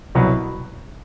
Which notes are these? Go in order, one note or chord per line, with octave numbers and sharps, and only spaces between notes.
C2 B2 F#3 B3